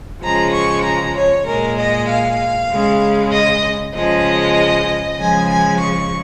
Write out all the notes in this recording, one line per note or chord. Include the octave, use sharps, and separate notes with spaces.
C#3 F3 G#3 A#5
C#6
A#5
C#5
A#2 G#3 A#4
D#5
F5
C#3 G#3
D#5
C#3 F3 G#3 D#5
C#3 F3 G#3 G#5
G#5
C#6